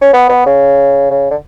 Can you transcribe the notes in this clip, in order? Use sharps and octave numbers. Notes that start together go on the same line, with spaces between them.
C#4
B3
B3
C#3
C#3
D3